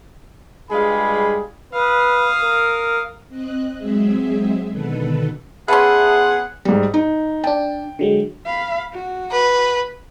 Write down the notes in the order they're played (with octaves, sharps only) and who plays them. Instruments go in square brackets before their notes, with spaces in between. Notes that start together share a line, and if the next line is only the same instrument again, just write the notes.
[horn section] G2 G3 G#3 F4 G#4 B5
[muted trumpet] B4 [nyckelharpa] F5 D#6
[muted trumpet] A#4
[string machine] C4 D#5 F#6
F#3 G#3 C4 G#4 E5
B2 D3 D#3 A4 B4
[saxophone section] B3 G#4 [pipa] C#4 B4 [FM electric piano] E5 A5 C6 [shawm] F#5
[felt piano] G#2 G3
D#4
[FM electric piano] D4 A5 [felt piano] G5
[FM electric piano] D3 F#3 G#3
[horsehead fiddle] F5 B5
F#4
[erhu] B4